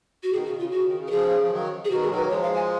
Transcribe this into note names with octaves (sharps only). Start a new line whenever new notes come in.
F#4
B2 D#3 G#4
C#3 F#4
D#3
C#3 F4
C#3 F#4
D#3
C#3
A#4
C#3 F3 G#4
F3
D#3 F#3
G#4
B2 D#3 F#4
G#3 G#4
D#3 F#3 A#4
B4
A#3
F3 G#3 C#5
F5
G#5